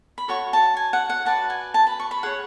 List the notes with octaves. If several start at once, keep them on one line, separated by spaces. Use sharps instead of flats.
B5
F#4 A4 C#5 C#6
A5
G#5
F#5
F#5
F#4 B4 D5 A5
G#5
A5
B5
C#6
B5
G#4 C#5 F#5